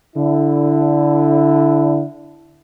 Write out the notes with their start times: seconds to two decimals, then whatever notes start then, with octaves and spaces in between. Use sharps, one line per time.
0.16 D3 E4